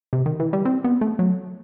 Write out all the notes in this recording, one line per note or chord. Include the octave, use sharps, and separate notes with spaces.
C3
D#3
E3
G3
C4
B3
A3
F#3